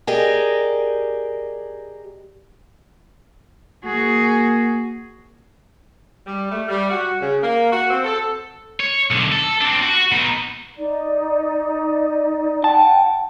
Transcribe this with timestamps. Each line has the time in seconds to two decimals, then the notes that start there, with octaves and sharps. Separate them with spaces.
0.07 G4 G#4 A#4 D5 D#5
3.84 A#3 F#4 G#4
6.27 G3
6.52 A3
6.68 G3
6.90 F#4
7.20 C#3
7.43 A#3
7.72 F#4
7.90 C4
8.04 A4
8.80 C#5
9.10 B1 D3
9.32 A4
9.61 C4 D4
9.83 F#4
10.12 B2 D#4
10.78 D#4 D5
12.64 F#5 G5 A5